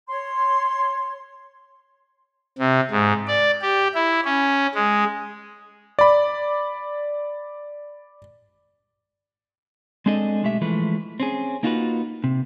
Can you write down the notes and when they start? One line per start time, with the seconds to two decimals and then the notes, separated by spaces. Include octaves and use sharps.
0.08 C#5 C6
2.58 C3
2.91 G#2
3.27 D5
3.62 G4
3.94 E4
4.25 C#4
4.75 G#3
5.99 D5 B5
10.06 G#3 C4 D4 G#4 A4 D#5
10.43 B1 G#3 A3 G4 E5
10.62 E3 F3 G#3 A3 B4
11.20 C4 C#4 G#4
11.63 A#3 D#4 F4 F#4 G#4 B4
12.24 C3